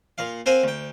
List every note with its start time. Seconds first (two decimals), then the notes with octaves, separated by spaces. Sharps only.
0.18 A#2 F5
0.46 C4 A#4 C5 F5 F#5 G#5
0.64 D2 G5